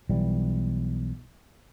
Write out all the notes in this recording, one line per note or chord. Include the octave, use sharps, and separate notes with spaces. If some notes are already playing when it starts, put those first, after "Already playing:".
B1 E3 G3